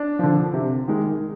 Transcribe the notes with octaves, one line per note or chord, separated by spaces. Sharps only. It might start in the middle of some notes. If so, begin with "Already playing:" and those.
Already playing: D4
D3 F3
C3
D#3 G#3